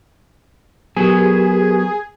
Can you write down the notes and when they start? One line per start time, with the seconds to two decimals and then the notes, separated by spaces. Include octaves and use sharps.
0.96 F#3 B3 G4 G#4 A#4